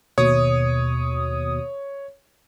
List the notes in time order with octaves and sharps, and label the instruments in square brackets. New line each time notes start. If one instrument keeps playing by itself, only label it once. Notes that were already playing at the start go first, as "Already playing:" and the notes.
[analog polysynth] D#2 B2 D#6 [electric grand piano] C#5